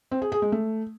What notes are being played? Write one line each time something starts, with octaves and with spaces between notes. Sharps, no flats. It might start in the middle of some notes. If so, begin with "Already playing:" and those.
C4
G#4
G#4
G#3
A3